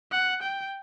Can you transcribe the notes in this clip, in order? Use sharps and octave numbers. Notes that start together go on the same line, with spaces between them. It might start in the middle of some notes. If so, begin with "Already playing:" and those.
F#5
G5